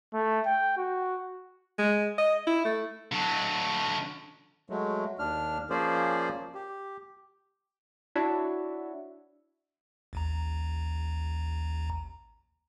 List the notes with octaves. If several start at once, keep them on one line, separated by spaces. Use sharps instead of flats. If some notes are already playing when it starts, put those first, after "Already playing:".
A3
G5
F#4
G#3
D#5
E4
A3
D3 F#3
F#3 G#3 A3
D#2 D4 F6
F3 A#3 C#4 G#4 C5 D5
G4
D4 E4 F#4 C#5 E5
A1 D#2 A#5